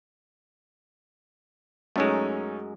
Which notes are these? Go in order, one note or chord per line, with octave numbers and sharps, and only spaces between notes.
F#2 G#3 A3 C#4 D#4